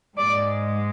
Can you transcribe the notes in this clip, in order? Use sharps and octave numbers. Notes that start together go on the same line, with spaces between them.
G#2 G#3 D5